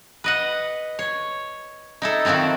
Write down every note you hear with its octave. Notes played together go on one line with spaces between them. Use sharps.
B4 D#5 F#5
C#5
D#4 E4 A4
D#3 F3 F#3 C4 E4